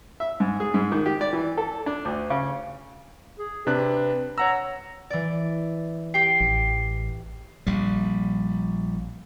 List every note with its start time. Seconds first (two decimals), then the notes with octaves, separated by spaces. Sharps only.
0.20 E5
0.40 G#2
0.60 G#4
0.74 G#2
0.92 D#3
1.06 G4
1.21 D5
1.33 E3
1.57 A4
1.86 D4
2.05 D2
2.30 C#3
3.39 G#4
3.67 C3 D4 B4 F#6
4.38 C#5 F#5 A#5 E6
5.10 E3 D5
6.14 G4 G5 C7
6.41 A1
7.67 A#1 G3